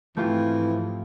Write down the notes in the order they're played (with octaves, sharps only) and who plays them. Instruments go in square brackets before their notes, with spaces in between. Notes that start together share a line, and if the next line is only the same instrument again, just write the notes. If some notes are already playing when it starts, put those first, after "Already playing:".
[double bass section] G#2 F3 C4 [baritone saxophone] E3 [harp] A3 F4 G4